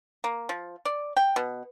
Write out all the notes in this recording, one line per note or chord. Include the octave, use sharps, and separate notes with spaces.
A#3
F3
D5
G5
B2